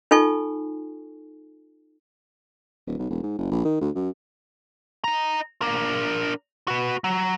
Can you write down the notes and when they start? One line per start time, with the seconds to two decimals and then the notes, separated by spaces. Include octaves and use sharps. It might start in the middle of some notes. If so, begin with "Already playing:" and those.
0.11 D#4 F4 A4 G#5 C#6
2.87 D#1
2.99 B1
3.10 E1
3.23 G#2
3.38 F#1
3.51 A#1
3.65 D#3
3.81 D2
3.95 F#2
5.04 D#5 A#5
5.62 D4 A#4
6.68 F#4 B4
7.04 F#3